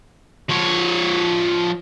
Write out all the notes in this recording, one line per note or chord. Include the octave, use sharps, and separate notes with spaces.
F3 C#5